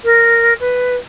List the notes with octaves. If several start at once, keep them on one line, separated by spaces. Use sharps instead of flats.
A#4
B4